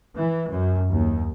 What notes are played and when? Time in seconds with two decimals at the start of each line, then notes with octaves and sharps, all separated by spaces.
0.16 E3
0.50 F#2
0.90 D#2